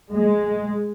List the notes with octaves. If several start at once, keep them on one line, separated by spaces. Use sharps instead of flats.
G#3